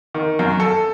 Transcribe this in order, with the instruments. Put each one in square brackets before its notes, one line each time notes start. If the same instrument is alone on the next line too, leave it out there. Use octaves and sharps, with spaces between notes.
[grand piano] D#3
F#2
A4